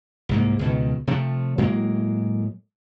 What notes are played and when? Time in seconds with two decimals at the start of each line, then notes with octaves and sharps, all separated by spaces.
0.29 C2 G#2 A#3
0.59 C#2 B2 D#3
1.07 C3 F3 A3
1.58 A2 F#3 G#3 A#3